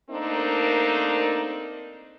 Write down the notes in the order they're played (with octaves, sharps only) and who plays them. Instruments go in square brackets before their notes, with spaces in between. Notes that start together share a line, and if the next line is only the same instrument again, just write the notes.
[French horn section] A3 A#3 C4 D4 D#4 A#4